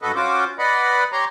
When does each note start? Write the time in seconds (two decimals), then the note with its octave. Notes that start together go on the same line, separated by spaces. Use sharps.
0.02 G2 F#4 A4 B4 D#5
0.16 C#4 F4 F#4 C5 D6
0.59 B4 D5 D#5 F#5 B5
1.12 G4 C#5 A#5 C6